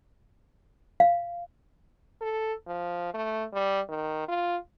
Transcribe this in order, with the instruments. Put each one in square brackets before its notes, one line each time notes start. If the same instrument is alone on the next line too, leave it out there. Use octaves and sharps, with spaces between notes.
[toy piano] F5
[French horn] A4
F3
A3
G3
D#3
F4